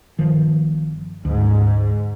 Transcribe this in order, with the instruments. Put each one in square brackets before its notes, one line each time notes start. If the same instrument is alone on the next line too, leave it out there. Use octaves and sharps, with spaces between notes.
[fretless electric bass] G1 D#3 F3
[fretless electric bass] D2 [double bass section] G#2